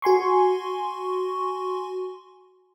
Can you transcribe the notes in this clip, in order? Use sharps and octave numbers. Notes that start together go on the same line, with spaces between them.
F#4 G#5 C6 C#6